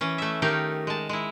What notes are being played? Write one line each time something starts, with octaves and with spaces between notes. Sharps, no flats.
E3 C#4
A3 E5
D#3 A3 D#4 G4 A#4 F5
G#3 A5
G#3 E4